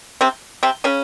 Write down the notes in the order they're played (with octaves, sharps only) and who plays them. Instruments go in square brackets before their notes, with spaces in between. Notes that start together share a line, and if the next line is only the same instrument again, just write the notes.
[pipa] C3 C4
C3 C4
C#3 C#4